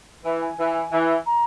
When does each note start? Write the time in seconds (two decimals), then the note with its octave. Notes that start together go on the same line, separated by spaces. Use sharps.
0.25 E3
0.42 G#5
0.59 E3
0.92 E3
1.26 A#5